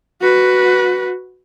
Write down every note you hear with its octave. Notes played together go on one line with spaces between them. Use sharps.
F#4 B4